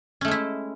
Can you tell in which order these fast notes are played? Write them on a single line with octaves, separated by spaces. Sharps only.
C#4 A3 G#3 E4